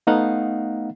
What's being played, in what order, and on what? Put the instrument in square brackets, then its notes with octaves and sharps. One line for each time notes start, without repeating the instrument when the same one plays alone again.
[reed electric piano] A3 B3 D#4 D#5 F5 F#5